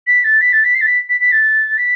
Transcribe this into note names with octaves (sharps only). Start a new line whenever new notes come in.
B6
A6
B6
A6
B6
C7
A6
B6
B6
B6
A6
B6